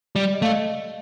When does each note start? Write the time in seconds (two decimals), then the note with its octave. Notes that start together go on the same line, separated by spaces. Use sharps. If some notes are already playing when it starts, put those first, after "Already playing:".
0.15 G3 D5
0.34 D#5
0.42 A3 F5
0.51 D#5